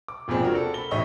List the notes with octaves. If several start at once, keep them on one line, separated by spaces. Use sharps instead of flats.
D6
F1 F2 A#2 G#3 C4
D4 F#4 A#4
A4
B5 G7
E1 A1 D#4 D#5 E5 C#6